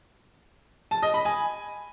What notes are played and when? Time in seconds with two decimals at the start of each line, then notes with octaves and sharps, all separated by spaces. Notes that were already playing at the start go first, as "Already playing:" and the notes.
0.91 A5
1.03 D#5
1.14 B5
1.25 G#5